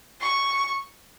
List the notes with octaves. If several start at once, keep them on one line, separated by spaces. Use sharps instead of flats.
C#6